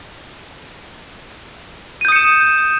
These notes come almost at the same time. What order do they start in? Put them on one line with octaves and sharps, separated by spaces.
D#7 G6 D#6 C#7 E7